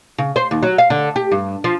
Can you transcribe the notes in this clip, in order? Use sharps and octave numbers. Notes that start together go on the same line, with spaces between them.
C#3
C5
D#2
F#3
F5
D3
G4
G2
F3